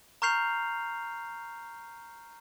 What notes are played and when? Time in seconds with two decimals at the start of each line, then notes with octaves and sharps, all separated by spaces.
0.22 A#5 C#6 F6 G6 C7 F7